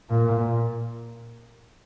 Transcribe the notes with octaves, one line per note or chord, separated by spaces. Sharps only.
A#2